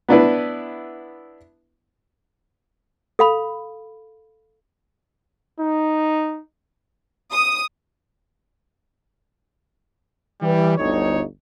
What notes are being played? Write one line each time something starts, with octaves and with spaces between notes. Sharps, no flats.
B3 D4 E4 B4
A4 F5 B5
D#4
D#6
E3 G3
G1 D2 D#4 C#5